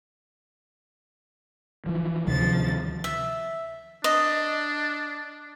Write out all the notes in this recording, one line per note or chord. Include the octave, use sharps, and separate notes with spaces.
E3 F3
D2 C3 D#3 F3 A6
E5
D4 D#5